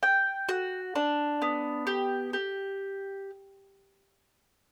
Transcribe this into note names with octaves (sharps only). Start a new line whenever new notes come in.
G5
F#4
D4
B3
G4
G4